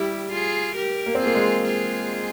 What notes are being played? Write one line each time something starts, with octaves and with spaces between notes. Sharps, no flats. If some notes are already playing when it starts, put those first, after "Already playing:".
Already playing: G3 E4 G4
F4 G#4
G4 A#4
A#3
C4
F4 G#4
A#3
G#3
F4 G#4